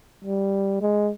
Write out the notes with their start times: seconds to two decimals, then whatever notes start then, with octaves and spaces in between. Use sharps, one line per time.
0.24 G3
0.81 G#3